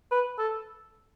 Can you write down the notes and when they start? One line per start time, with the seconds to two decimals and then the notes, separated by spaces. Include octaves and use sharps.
0.12 B4
0.38 A4